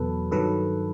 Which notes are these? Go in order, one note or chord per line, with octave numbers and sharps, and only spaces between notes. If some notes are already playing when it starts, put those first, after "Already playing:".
Already playing: E2 B2 F#3 A4 B4
G2 D#3 F#3 A4 B4